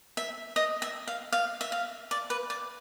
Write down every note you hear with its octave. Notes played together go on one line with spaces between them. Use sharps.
E5
D#5
E5
F5
F5
E5
F5
D5
B4
D5